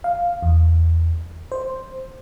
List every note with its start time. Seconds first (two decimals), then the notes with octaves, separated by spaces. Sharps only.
0.04 F5
0.42 E2
1.52 C5